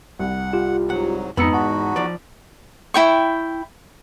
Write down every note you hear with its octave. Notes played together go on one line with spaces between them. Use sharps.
C2 F#5
F4 G4
G#2 F#3 F#5
F2 G#2 B3 D#4 A#5 B5 E6 C#7
E2 F#4 F#5 A5
F3 D5
E4 G5 C#6